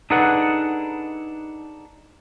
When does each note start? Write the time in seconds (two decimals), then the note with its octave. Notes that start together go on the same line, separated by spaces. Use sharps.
0.10 D4 D#4 G#4 A4 B4 F#5